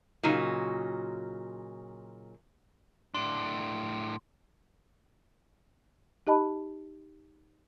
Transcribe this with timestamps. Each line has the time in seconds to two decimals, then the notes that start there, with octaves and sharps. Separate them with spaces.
0.23 A#2 C#3 F#3 D#4
3.15 A2 D4 C6
6.27 D#4 G4 D#5 A5 B5